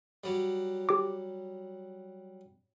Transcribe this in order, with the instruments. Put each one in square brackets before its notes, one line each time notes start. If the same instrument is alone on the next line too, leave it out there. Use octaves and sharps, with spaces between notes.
[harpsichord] F#3 G3
[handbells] G4 D6